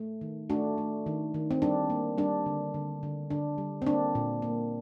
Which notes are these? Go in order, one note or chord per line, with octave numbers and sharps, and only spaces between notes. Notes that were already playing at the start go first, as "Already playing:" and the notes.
Already playing: A3
D#3
A3 D4 F#4
A3
D#3
D#3
C4
G3 D4
A#3
G3 D4
D3
D3
D3
D3 D4
G3
C4
A#3 D4
A#2
A#3